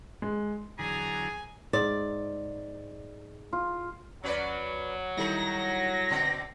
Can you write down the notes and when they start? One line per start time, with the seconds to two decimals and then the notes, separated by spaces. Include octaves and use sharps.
0.22 G#3
0.79 E2 D3 F#3 G#4 G#5 A#5
1.73 G#2 D5
3.53 F4
4.24 D#2 F#3 C#4 B4 D5
5.17 D#3 G3 D#4 E4 A4 A#6
6.10 B2 D3 C4